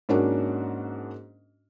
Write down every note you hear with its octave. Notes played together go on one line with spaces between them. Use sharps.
G#2 A#3 C#4 D4 F#4